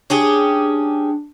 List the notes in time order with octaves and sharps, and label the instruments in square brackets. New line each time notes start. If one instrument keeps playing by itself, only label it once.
[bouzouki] C#4 G4 G#4 [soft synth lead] D4